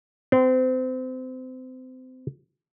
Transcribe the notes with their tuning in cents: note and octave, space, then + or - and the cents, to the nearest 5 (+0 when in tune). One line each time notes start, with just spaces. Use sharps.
C4 -30